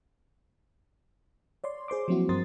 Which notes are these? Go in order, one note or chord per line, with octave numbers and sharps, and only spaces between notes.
C#5 D5 C6
G#4 C5 C6 D6
F3 F#3 A#3 C4 E4 F#4
G2 C4 A#4 C6 D#6 A6